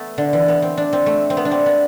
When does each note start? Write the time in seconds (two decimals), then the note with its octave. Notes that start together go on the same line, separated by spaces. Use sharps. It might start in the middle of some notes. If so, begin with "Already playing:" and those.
Already playing: A3 B3
0.18 D3
0.33 E3
0.48 B3
0.62 C4
0.77 D4
0.93 C4
1.06 A3
1.30 C4
1.37 B3
1.45 D4
1.51 C4
1.66 B3